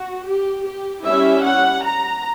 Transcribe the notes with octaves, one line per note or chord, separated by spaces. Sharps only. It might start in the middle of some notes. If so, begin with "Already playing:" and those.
Already playing: F#4
G4
G4
G3 C#4 E4 E5
F#5
A#5